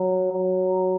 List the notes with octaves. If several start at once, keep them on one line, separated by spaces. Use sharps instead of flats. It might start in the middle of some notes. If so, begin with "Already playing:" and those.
Already playing: F#3
F#3